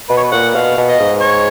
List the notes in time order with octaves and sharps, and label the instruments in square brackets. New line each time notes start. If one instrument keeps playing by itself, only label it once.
[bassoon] B2 [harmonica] B4
[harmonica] C#5
B4
[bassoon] A#2 [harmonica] F#5
[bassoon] B2 [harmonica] F5
[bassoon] B2
[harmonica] D#5
[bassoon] G#2
[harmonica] C#5